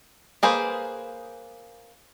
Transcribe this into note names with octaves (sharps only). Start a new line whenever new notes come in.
A#3 G#4 B4 C5